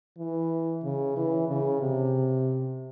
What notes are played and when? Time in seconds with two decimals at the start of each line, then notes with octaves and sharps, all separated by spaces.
0.18 E3
0.84 C#3
1.17 E3
1.49 C#3
1.81 C3